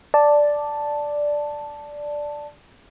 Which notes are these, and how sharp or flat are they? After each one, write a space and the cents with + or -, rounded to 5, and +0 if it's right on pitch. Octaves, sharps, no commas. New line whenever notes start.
D5 +0 A5 +0